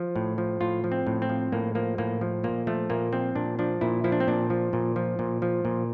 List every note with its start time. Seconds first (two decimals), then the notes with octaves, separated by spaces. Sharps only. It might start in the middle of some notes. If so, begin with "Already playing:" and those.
Already playing: F3
0.16 A2
0.38 F3
0.61 A2 F4
0.84 F3
0.92 C4
1.07 A2
1.22 C4
1.29 F3
1.52 A2 A#3
1.75 F3 A#3
1.98 A2 A#3
2.21 F3
2.44 A#2 A#3
2.67 F3 A3
2.90 A#2 A#3
3.13 F3 C4
3.35 A#2 D4
3.59 F3 D4
3.81 A#2 E4
4.04 F3 E4
4.12 D4
4.20 C4
4.28 A#2 D4
4.50 F3
4.73 A#2
4.96 F3
5.19 A#2
5.42 F3
5.65 A#2